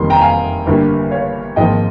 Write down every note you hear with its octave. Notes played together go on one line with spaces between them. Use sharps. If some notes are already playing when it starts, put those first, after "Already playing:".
Already playing: F1 F2 D#3 G3 A#3 C6
G5 A#5
F5 G#5
G1 G2 G3 A#3
C#5 F5
G#1 G#2 F3 A#3 D#5 G5